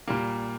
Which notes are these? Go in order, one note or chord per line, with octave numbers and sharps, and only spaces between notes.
A#2 G3 A#3